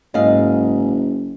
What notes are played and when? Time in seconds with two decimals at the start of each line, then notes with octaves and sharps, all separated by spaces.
0.14 F#1 G#2 D#5 F5